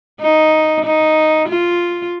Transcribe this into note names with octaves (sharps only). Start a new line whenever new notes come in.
D#4
D#4
F4